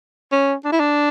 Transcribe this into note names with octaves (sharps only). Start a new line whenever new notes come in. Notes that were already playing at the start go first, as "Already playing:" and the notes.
C#4
D4
E4
D4